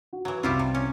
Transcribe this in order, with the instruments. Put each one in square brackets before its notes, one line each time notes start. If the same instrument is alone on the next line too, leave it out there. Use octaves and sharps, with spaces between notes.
[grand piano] F#4
[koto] E3 F#3
[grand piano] C2 [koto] G3 E4 F4
[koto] C3
C#4